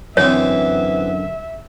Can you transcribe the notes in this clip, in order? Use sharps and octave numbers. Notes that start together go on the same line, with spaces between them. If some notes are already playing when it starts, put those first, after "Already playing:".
F#2 D3 E3 B3 C4 C#5 E5